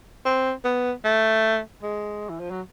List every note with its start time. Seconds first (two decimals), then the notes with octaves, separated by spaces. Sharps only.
0.25 C4
0.65 B3
1.05 A3
1.82 G#3
2.29 E3
2.39 F3
2.51 F#3